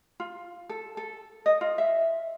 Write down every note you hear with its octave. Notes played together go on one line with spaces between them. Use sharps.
F4
A4
A4
D#5
F4
E5